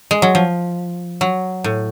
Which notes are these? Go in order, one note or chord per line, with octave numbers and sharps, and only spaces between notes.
G#3
F#3
F3
F#3
A2